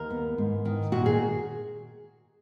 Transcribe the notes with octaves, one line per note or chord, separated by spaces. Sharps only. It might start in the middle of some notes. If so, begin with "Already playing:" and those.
Already playing: D#2 A#4
B3
G#2
D#3
A#2 F#4
G#4